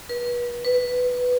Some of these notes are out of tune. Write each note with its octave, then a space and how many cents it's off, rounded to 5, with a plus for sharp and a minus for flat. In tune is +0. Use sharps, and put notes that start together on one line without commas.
B4 -35
B4 +5